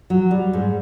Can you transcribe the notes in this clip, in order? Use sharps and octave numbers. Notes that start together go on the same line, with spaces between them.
F#3
G3
G#2